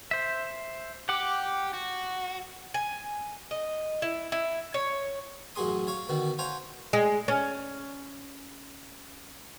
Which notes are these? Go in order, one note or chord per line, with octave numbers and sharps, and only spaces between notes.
C5 E5
G4 F#5 D6
F#4
G#5
D#5
E4
E4
C#5
A1 F#2 F#4 G#4 C6 D#6
C#5 F5 C#6
B2 D3 D#3 F#4
C5 C#5 F5 F#5 G#5 A#5
G#3
C#4